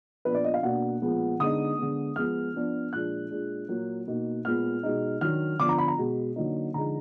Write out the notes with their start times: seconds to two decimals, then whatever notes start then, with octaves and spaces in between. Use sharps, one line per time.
0.25 A#2 F3 B3 D4 B4
0.34 D5
0.44 D#5
0.54 F5
0.63 B2 A#3 D4 F#5
1.02 A#2 F3 G#3 B3
1.40 D3 G#3 B3 D#4 D#6
1.78 D3 G#3 B3
2.16 F3 G#3 B3 F6
2.54 F3 B3 D4
2.92 A#2 F3 G#3 D4 F#6
3.30 A#2 G#3 D4
3.69 A#2 F#3 A#3
4.07 B2 A#3 D#4
4.45 A#2 G#3 B3 F6
4.83 B2 G#3 D#4
5.21 D#3 F#3 D4 F6
5.59 D3 F3 B3 D4 D6
5.69 A#5
5.78 B5
5.88 A#5
5.98 B2 G#3 B3
6.36 D3 F#3 A#3 D#4
6.74 D3 F3 G#3 D#4 A#5